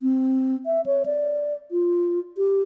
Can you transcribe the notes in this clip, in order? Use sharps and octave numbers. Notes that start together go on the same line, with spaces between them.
C4
E5
C#5
D5
F4
G4